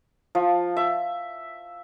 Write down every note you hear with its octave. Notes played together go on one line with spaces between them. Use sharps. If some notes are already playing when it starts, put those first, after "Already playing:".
F3
E5